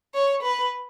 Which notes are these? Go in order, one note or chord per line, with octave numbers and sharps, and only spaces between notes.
C#5
B4